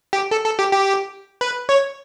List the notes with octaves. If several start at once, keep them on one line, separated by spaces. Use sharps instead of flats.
G4
A4
A4
G4
G4
B4
C#5